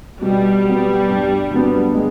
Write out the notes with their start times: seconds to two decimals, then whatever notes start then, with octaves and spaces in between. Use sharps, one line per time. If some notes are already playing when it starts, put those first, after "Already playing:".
0.21 B2 G3
0.65 F#3 B3
1.08 G2
1.51 D3 F#3 B3
1.95 G#3